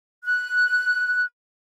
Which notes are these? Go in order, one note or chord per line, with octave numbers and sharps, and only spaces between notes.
F#6